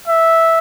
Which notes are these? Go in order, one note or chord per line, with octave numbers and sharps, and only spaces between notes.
E5